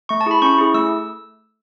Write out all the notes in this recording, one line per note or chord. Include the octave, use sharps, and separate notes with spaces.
A3 C#6
A5
E4 G#4 B5
C#4 C#6
E4 G#4
A3 E6